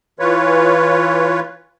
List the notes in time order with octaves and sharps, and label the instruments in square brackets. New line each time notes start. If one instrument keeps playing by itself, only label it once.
[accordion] E3 F4 B4 C#5